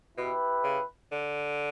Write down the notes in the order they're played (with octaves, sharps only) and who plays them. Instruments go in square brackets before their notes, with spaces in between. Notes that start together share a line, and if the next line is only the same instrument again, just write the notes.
[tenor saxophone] B2 [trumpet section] E4 G4 B4
[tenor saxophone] C#3
D3